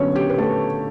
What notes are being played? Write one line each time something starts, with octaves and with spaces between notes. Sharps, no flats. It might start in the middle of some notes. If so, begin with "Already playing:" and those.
Already playing: D3 F#3 B3 C#4 C#5
G4
B4
A3 A4